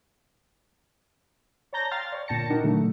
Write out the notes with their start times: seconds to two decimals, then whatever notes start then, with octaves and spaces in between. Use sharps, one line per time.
1.73 C#5 D5 A5 A#5 G6 A#6
1.91 F5 G5 C6 F6 A6
2.12 C#5 D5
2.28 A#2 D3 G5 A5 A#6 C#7
2.50 D4 D#4 F#4 A#4
2.64 A#2 D3 D#3 F#3 A3